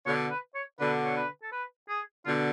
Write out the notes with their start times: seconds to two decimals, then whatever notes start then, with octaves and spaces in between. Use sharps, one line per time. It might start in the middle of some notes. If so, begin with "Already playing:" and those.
0.06 B2 D3 C#5
0.31 B4
0.55 C#5
0.78 B2 D3 B4
1.05 C#5
1.16 B4
1.42 A4
1.52 B4
1.89 G#4
2.25 B2 D3 F4